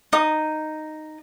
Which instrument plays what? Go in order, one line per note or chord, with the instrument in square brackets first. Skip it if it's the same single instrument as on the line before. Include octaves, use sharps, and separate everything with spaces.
[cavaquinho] D#4 D#6